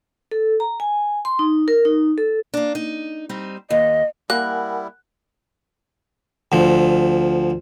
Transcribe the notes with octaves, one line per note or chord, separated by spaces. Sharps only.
A4
A#5
G#5
C6
D#4
A#4
D#4
A4
A#3 D4
D#4
G3 C4 D#4
D#2 D#5
G3 A#3 E4 A#4 F#5 G#5 F#6
D2 F3